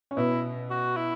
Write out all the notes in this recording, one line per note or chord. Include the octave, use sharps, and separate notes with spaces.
C#4
B2 B3 E4
F#4
E4